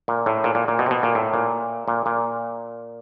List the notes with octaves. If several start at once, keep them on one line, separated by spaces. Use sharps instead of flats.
A#2
A2
A#2
A#2
A#2
B2
C3
B2
A#2
A2
A#2
A#2
A#2